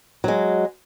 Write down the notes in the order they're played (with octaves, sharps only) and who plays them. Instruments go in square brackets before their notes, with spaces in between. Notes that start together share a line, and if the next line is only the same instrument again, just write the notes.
[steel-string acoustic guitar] F#3 G#3